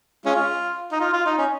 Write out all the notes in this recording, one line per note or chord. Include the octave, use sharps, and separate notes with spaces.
G#3 C#4 F4
D#4
F4
F4
D#4
C#4